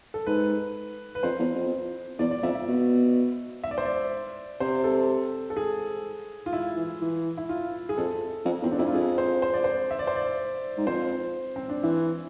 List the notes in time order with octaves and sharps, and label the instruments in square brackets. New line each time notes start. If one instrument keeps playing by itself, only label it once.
[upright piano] A4
[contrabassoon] G#2 [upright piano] B4
[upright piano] B4
[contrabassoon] F2 [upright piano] C5
[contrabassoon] E2
F2
[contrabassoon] E2 [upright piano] D5
[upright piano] D5
[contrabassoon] F2 [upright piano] E5
[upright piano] E5
[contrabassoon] B2
[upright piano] E5
D5
C5
D5
[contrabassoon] C3 [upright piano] C5
[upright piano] A4
A4
G#4
F4
E4
[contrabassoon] E3
E3
[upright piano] E4
F4
G#4
[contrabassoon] F2 [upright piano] A4
[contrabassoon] F2
[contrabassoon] E2 [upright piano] C4
[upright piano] D4
[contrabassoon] F2 [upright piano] E4
[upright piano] F4
[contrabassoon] F2 [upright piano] G#4
[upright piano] C5
C5
D5
C5
E5
D5
C5
D5
[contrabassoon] G#2
[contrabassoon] F2 [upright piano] C5
[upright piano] C4
D4
[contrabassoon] E3 [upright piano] E4